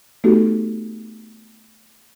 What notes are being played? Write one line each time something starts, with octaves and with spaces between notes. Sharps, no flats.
A3 B3 D#4 F#4 G4 A4